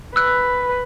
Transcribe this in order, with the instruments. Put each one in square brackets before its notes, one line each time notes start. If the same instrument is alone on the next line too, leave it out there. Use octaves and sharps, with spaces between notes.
[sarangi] B4 [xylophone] E6 F#6